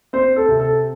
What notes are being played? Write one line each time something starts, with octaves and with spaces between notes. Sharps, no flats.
C4 C5
A4
C3
A4